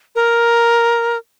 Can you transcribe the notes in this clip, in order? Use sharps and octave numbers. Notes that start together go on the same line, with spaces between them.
A#4